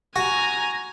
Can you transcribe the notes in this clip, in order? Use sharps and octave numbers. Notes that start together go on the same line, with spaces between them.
F#4 G#5 A#5